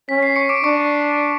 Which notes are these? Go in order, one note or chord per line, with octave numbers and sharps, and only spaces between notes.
C#4 B6
C7
C#6 C#7
D6 D7
D4 C#6 C#7